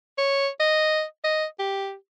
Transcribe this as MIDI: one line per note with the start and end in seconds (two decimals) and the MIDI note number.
0.18 0.48 73
0.60 1.03 75
1.24 1.45 75
1.59 1.94 67